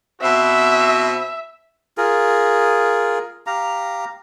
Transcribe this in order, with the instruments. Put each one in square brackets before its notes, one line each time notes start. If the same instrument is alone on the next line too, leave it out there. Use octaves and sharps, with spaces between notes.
[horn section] B2 C4 F#4 [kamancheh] E5
[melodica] F4 G#4 A#4
G4 F5 A#5